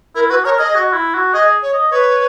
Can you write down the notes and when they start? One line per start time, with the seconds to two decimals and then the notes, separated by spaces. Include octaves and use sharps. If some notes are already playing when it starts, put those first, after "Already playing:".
0.15 E4 A#4
0.30 F#4 B4
0.44 A#4 C#5
0.59 G#4 D#5
0.75 F#4
0.93 E4
1.14 F#4
1.33 G#4 D#5
1.62 C#5
1.73 D#5
1.91 B4 C#5